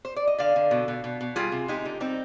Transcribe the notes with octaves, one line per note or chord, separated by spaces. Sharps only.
C5
D5
D#5
D3 D5 F5
D3
B2
B2
B2
B2
G3 F4 G#4
C3
G#3 D#4 G4
D3
G3 C4 D#4